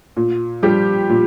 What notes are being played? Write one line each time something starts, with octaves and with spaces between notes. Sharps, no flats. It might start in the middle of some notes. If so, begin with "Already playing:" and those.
A#2
F3 G3 G4
A#2